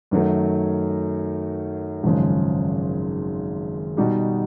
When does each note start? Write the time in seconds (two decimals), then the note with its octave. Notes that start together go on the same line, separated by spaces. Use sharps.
0.11 F#2 D#3 F#3 A3
2.04 G#1 F#2 C#3 F3 G#3
3.97 B2 G3 B3 D#4 F#4